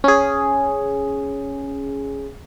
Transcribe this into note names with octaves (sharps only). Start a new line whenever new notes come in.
C#4 G#4